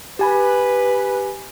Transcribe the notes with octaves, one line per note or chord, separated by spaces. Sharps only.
G4 B4 G#5 B5